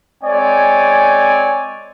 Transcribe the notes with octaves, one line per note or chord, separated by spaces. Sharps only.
G#3 C4 C#5 D5 G#5